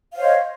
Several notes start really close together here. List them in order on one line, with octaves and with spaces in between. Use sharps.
F5 C5 C#5 D#5